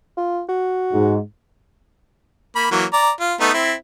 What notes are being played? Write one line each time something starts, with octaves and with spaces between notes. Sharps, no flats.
F4
F#4
G#2
A#3 B5
E3 F#3 A#3
D5 A#5
F4
A3 B3 D#4
C4 E4